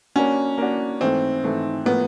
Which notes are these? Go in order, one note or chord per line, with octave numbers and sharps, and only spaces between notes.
A#3 C#4 D4 F#4
A#3 D4 F#4
G#2 E3 A3 C4
G#2 E3 A3
A2 F3 A#3 B3